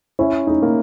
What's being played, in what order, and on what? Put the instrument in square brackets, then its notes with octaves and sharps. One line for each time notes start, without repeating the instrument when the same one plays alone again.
[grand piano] C#4 [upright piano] E4
[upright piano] D#4
[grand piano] A#3